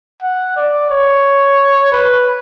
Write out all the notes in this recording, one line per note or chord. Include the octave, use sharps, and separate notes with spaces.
F#5
D5
C#5
B4